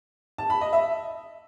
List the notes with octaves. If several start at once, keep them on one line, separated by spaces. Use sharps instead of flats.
A5
B5
D#5
E5